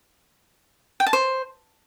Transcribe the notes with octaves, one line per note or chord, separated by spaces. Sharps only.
G5
A5
C5